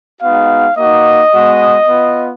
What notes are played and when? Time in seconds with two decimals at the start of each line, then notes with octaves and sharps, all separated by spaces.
0.22 G#3 B3 D#4 F#4 F5
0.77 A#3 D#4 F#4 D#5
1.34 G#3 B3 F#4
1.89 B3 F4